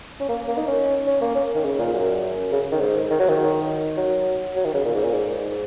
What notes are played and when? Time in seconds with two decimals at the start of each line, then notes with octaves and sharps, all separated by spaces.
0.20 C#4
0.29 A#3
0.47 A#3
0.57 D#4
0.67 C#4
1.07 C#4
1.21 A#3
1.35 C#4
1.55 D#3
1.64 C#3
1.79 A#2
1.94 F#2
2.52 C#3
2.72 D#3
2.80 G#2
3.10 D#3
3.19 F#3
3.29 D#3
3.97 F#3
4.56 F#3
4.65 D#3
4.74 C#3
4.85 A#2
4.95 G#2
5.03 A#2
5.13 G#2
5.29 G#2